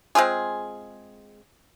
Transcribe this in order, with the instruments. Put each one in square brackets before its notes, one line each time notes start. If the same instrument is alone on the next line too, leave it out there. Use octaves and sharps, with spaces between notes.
[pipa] G#3 C4 F4 G#4